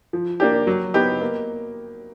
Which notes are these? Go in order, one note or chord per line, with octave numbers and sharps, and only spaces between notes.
F3
A#3 D4 G4
F#3
B3 D#4 G4
A#3